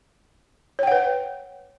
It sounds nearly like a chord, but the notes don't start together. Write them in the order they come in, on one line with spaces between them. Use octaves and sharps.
C#5 G5 F#5 B4